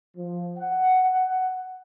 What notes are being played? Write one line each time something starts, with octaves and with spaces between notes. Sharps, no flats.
F3
F#5
F#5